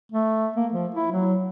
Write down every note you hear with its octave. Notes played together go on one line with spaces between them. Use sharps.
A3
A#3
F3
E4
F#3